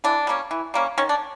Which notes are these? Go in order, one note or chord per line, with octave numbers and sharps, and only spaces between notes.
E3 D4
G3 A#3 C#4
E3
G3 A#3 C#4
D#3 C#4
D4